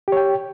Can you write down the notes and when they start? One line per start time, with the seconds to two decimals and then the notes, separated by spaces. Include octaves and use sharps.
0.08 G4
0.12 C#5
0.17 G5